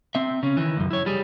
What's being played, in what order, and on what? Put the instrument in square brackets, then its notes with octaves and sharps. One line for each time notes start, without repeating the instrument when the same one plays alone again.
[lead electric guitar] C4 E5
C#3 C#4
D#3 E3
C#2 F#2
E4 C#5
G3 G#4